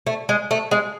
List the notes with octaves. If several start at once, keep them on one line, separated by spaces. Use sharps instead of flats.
A3
G#3
A3
G#3